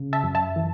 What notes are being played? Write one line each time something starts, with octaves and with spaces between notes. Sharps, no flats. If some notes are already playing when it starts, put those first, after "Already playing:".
Already playing: C#3
E5 A5
F#2
E5 A5
E3